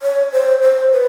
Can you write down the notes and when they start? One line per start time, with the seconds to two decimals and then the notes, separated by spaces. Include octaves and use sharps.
0.02 C#5
0.32 C5
0.62 C5
0.92 B4